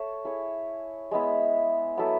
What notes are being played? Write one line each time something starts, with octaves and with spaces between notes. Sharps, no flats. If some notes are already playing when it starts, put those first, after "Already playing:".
Already playing: A4 C#5 E5
E4 G#4 C#5
G#3 B3 E4
F#3 B3 E4 A4